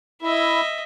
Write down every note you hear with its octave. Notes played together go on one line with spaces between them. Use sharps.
E4 D#5 E5